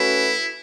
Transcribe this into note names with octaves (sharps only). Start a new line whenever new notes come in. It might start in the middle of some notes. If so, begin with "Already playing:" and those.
Already playing: A3 C#4 E4 F#4 B4